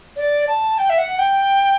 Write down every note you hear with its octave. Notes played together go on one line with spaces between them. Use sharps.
D5
A5
G5
E5
F#5
G5